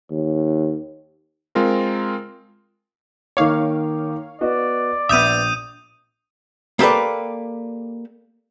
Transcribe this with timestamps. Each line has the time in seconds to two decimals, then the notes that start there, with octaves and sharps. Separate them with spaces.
0.11 D#2
1.55 G#3 C4 F4 A#4
3.37 D#3 A#3 C#5 F5 D6
4.41 B3 F#4 D5 D#5
5.09 A#1 B3 E5 D#6 G6 D#7
6.79 A#3 G4 A4 B4 D5